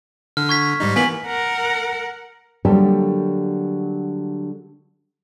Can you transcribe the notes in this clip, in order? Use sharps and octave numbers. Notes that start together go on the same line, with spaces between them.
D3 F6
C#6 G#6 B6
G#2 G3 D#4
E3 A#3 B3 G#5 B6 F#7
A#4 F#5
D3 F#3 G3 A#3 G4 A4